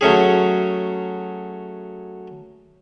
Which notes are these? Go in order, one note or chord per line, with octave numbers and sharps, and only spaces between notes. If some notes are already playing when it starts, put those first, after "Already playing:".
F#3 A3 C#4 G#4